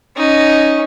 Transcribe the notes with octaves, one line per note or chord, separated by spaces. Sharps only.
C#4 D#4